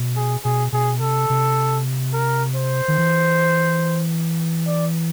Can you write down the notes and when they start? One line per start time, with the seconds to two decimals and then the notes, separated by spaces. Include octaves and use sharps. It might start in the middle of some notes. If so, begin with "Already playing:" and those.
Already playing: B2
0.16 G#4
0.44 B2 G#4
0.72 B2 G#4
1.00 C3 A4
1.30 C3
2.13 A#4
2.56 C5
2.88 D#3
2.98 E3
4.67 D5